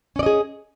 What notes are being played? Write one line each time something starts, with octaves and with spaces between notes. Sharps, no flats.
C#4 G#4 D5 D#5